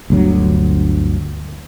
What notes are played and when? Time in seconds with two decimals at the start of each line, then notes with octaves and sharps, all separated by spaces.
0.10 G1 D2 F#3